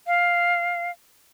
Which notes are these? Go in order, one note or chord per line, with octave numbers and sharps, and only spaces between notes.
F5